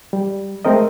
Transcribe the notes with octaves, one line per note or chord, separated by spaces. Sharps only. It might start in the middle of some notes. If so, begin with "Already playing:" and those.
G3
G#3 A3 C4 A#4 D#5